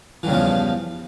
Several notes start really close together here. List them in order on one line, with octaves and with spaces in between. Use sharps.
E3 G2 C#3 E2 F3